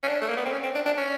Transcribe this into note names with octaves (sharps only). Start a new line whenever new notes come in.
C#4
D4
A3
A#3
B3
C4
C#4
C4
D4
D4
C#4